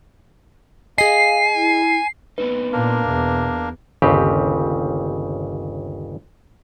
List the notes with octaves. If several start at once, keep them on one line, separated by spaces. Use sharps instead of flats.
G#4 D#5 F5 G#5 C7
E4
B3 C4 D#4 B4
A#2 A#3 D4 A#4
E2 B2
G1 D#2 C#3 C4 G4 B4